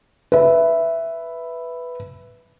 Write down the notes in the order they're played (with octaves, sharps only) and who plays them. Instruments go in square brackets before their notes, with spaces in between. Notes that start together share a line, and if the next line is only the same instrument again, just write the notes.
[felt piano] B4 E5